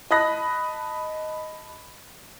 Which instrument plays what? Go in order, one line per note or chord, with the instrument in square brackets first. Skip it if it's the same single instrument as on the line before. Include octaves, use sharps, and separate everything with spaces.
[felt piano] D#5 A5 B5 D#6 F#6 A#6